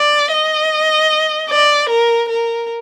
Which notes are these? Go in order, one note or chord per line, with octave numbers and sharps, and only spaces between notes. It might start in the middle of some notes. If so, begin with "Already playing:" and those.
Already playing: D5
D#5
D5
A#4
A#4